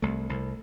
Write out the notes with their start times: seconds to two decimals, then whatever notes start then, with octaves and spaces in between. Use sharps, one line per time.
0.02 C2 A3
0.29 C2